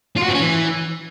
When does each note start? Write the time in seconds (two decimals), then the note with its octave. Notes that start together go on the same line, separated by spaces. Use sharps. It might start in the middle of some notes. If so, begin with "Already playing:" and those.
0.17 F4
0.22 F#4
0.28 C4
0.34 C#4
0.40 E3